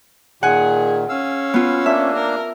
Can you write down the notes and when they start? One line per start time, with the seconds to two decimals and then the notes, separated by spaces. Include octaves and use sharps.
0.43 A#2 D#3 G#4 F#5 G#5
1.09 C#4 F5 E6
1.54 B3 F4
1.86 A#3 D4 E5
2.16 A#4